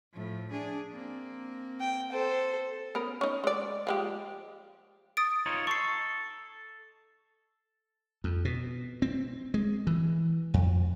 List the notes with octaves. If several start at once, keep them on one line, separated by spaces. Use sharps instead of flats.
A2 F3
D4 G#4
A#3 C4
G5
A4 C5
B3 C#4 A#4
C#4 D#4
G#3 D5
F3 G#3 G4
D#6 A6 D7
D#4 F4 C#5
A4 C#6 C7
F2
B2
C4
G#3
E3
F2